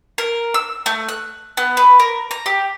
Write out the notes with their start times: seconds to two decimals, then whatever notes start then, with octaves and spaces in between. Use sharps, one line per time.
0.18 A#4
0.54 E6
0.86 A3
1.09 F#6
1.57 B3
1.77 B4
2.00 A#4
2.31 A#5
2.46 G4